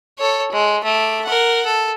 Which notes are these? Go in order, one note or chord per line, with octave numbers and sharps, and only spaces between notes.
A4 C#5
G#3
A3 D6
A#4 F#5
A4